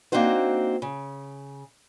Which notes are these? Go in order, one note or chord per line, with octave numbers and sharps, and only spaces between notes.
A#3 C4 D4 D#4 F#4 C5
C#3